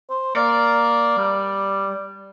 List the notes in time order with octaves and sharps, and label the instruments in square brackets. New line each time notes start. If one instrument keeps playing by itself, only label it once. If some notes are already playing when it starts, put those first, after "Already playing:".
[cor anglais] C5
[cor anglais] A#3 [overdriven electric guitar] D5
[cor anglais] G3